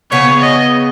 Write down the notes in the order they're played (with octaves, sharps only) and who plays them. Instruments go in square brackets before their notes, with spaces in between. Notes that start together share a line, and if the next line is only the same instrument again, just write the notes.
[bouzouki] C#3 B3 G#4 [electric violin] C#5
[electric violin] D#5